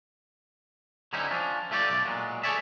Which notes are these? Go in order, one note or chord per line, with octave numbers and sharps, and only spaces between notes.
D3 F#3 C4 C#4 D#4 E4
F3 C#4 D4
A3 F4 G4 A4 C5 D5
B1 D5
A#2 F#3 G#3
G#4 A4 B4 C#5 D5 E5